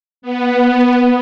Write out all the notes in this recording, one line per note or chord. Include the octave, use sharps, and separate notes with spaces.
B3